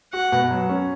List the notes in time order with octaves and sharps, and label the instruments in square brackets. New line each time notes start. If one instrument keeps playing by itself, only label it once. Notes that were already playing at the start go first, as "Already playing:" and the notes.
[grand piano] F#4 [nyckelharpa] F#5
[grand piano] B2
F#3
C#4